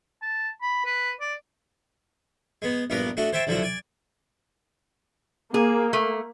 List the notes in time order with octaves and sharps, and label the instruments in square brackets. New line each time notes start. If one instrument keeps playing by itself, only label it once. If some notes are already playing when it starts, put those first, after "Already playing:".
[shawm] A5
B5
B4
D5
[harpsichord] G#3 B3
A#1 G2 B3 A#4 B4
A3 D4 F#4 D#5 F#5
C5 C#5 E5 G5 A5
C2 D3 F3 F#3 F#4 E5
D5 G#5
[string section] A#3 [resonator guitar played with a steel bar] G#4
[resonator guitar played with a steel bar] A3